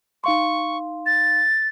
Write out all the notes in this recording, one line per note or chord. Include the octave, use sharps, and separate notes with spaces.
D#4 F5 C6 C#6
A6